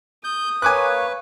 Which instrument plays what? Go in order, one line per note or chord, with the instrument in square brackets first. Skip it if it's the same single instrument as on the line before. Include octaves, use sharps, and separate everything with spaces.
[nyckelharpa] D#6 [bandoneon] G6
[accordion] A#3 C#5 [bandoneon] B4 [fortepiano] G#5 D6 F#6